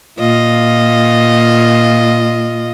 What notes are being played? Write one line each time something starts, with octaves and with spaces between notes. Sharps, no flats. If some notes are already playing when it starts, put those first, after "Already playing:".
A#2 F4 D#5